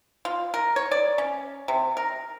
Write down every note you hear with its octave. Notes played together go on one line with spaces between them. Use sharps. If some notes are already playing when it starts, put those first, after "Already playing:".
F4
A#4
C#5
D5
C#4
C3
A#4